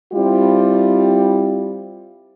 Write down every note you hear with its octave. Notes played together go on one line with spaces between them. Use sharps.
G3 C4 E4 F4 G4